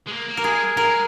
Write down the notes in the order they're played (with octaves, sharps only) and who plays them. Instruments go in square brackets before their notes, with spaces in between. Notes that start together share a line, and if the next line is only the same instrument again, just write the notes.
[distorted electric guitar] G#3
A#3
A#3
[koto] A#4
[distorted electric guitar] G#3 [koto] G#4
[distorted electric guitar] G#3 [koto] A#4